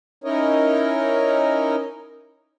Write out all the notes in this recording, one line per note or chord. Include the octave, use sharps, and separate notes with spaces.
C#4 D#4 E4 A#4 C#5 D#5